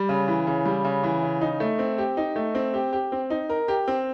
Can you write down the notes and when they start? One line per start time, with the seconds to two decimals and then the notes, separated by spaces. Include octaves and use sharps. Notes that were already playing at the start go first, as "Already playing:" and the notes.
Already playing: G3
0.09 C#3
0.28 E3
0.47 C#3
0.65 G3
0.84 C#3
1.03 E3
1.23 C#3
1.41 D#4
1.60 A3
1.79 C4
1.98 G4
2.17 D#4
2.36 A3
2.55 C4
2.74 G4
2.93 G4
3.12 C4
3.30 D#4
3.49 A#4
3.68 G4
3.88 C4